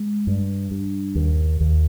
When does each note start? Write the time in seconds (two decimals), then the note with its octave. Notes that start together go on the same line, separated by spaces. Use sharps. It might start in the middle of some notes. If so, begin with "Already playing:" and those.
Already playing: G#3
0.27 G2
0.71 G2
1.15 D#2
1.61 D#2